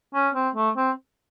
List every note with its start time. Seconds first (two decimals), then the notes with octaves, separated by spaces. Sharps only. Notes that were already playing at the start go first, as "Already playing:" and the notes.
0.14 C#4
0.35 C4
0.55 A3
0.77 C4